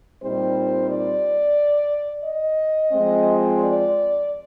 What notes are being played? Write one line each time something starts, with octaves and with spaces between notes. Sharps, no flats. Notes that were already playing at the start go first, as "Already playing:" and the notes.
A#2 G3 C4 D#4 C5
D5
D#5
F3 G#3 C4
D5